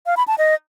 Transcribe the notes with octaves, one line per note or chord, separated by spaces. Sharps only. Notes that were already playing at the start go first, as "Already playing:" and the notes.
F5
B5
A5
D#5